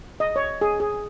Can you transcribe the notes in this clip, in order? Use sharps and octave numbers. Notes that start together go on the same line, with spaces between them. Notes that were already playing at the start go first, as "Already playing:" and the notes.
D#5
C#5
G#4
G#4